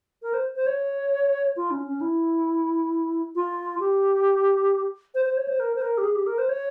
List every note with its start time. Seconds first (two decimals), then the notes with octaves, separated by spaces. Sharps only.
0.22 A#4
0.33 C5
0.55 C5
0.66 C#5
1.56 F4
1.71 C#4
1.87 C#4
2.01 E4
3.35 F4
3.79 G4
5.14 C5
5.25 C5
5.37 C#5
5.48 C5
5.59 A#4
5.75 C5
5.82 A#4
5.97 G4
6.03 G#4
6.15 G4
6.26 A#4
6.38 C5
6.49 C#5